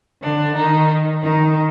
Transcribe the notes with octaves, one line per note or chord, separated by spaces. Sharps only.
D3 D4
D#3 D#4
D#3 D#4